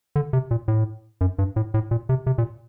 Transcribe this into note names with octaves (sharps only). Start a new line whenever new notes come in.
D3
C3
A#2
A2
F#2
G2
A2
A2
A#2
C3
C3
A#2